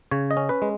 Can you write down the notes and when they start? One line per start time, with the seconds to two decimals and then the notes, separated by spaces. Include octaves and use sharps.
0.11 C#3 C#5
0.31 D#5
0.37 C#4
0.49 B4
0.62 G#3